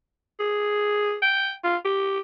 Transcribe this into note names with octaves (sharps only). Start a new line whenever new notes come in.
G#4
G5
F4
G4